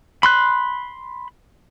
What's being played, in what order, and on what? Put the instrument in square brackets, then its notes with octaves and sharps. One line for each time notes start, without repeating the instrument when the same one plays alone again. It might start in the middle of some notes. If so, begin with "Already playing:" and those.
[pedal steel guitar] B5 C6 F#6